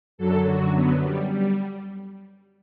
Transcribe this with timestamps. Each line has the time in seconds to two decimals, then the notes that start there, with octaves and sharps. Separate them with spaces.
0.18 F#2 D3 F#3 A4
0.47 F#4
0.74 B3
1.03 G3
1.31 G3